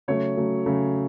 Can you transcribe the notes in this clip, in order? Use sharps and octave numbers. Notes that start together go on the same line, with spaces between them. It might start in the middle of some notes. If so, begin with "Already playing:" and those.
C#3 F#3 A3 C#5
C#3 F#3 A3
C#3 F#3 A3